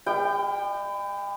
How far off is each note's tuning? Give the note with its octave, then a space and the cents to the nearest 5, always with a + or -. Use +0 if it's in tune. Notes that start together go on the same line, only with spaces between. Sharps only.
G3 +45 G5 -5